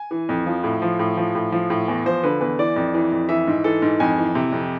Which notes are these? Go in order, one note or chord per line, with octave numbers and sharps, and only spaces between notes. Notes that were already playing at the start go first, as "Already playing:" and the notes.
Already playing: G#5
E3
F2
F3
A2
F3
A2
F3
A2
F3
A2
E2
F3 C5
D3 B4
E2 B4
E3 D5
F2
E3
F2
E3 E5
G#2
E3 A4
G#2
F2 G#5
E3
C3
F2